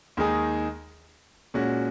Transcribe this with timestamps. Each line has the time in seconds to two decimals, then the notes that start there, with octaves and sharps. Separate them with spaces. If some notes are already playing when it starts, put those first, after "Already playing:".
0.17 D#2 D#3 G#3 D#4 G#4
1.54 A#2 G#3 C#4 F#4